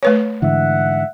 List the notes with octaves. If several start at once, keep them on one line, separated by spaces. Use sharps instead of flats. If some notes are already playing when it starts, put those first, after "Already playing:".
A3 B4 C#5
G#2 D3 E3 E5 F#5